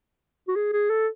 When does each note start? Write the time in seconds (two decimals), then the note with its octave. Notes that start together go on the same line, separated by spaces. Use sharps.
0.48 F#4
0.56 G#4
0.73 G#4
0.90 A4